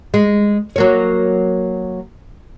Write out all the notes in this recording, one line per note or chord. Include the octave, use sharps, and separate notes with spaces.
G#3
F#3 A#3 C#5